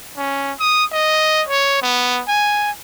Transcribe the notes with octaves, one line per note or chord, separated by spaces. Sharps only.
C#4
D#6
D#5
C#5
B3
G#5